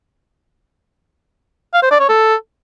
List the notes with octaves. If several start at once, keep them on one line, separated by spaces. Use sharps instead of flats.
F5
C5
D5
C#5
A4